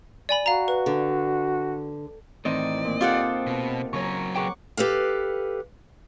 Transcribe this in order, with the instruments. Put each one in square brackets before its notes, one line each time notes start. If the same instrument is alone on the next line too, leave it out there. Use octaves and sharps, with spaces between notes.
[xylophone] D5 G#5 B5
[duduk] F#4 [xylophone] F5 A#5
[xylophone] B4
[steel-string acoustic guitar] D3
[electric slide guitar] A2 E3 [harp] D#3 C4 D#5 [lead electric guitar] D5
[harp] A#2
[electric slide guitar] C4 [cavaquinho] F4 A4 F#5 [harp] G4 D6 D#6
[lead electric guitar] B2
[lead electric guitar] C#3 F#3 [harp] C#5 A#5 C#6
[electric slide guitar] G#4 B4 G5 [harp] F#5 C#6 D6
[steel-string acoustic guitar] G4 A4 B4 F5